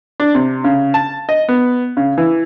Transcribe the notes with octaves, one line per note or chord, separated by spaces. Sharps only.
D4
C3
C#3
A5
D#5
B3
C#3
E3